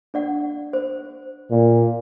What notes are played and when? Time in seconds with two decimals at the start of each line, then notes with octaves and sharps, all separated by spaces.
0.14 D4 D5 F#5
0.73 C5
1.51 A#2